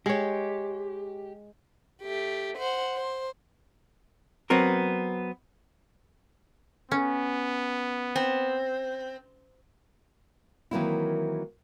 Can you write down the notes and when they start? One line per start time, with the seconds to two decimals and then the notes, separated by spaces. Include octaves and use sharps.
0.06 G#3 G4 C#5
2.02 A3 G4
2.57 C5 F#5
2.95 C5
4.50 F#3 B3 C4 A#4
6.91 B3 C#4
8.16 C4
10.71 D#3 E3 F#3 A#3 C4 E4